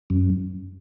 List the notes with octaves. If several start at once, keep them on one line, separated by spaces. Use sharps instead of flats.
F#2